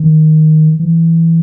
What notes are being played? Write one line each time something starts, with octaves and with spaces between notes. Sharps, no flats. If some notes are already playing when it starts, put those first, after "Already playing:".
Already playing: D#3
E3